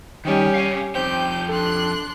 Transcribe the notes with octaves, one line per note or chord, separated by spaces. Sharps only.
D#3 G3 C#4 G4
F5 G#5
F2 C4 G4 G6
D4 A4 C6 F#6